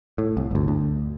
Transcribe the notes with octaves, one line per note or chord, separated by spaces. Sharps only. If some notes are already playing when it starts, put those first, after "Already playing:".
A2
C2
G1 D2
D2